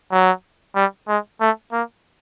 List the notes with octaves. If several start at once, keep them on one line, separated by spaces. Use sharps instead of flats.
F#3
G3
G#3
A3
A#3